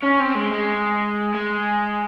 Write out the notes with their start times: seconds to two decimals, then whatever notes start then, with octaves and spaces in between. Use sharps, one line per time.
0.02 C#4
0.20 C4
0.35 G#3
0.52 G#3
1.35 G#3